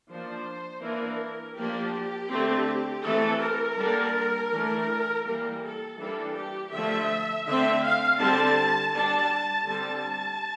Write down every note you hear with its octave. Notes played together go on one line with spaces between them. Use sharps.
F3 A#3 D4 C5
E3 A#3 D4 A#4
F3 A#3 D4 G4
D3 A3 C4
E3 A3 C4 A4
A#4
D3 G3 A#3 D4
E3 A3 D4
E3 G3 A#3 A#4
A4
E3 G3 A#3 D4 A4
G4
D3 F3 A3 E5
D3 A3 C4 E5
F5
D3 G3 C4 A5
G3 D4 A5
D3 G3 C4 A5